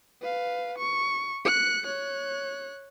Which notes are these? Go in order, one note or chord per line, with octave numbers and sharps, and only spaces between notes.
B4 F5
C#6
F#6 C#7
C#5 F#6